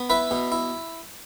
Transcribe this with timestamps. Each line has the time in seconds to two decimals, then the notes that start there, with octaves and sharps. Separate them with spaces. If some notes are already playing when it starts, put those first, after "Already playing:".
Already playing: B3
0.10 E4 B4 E5
0.31 B2
0.52 E4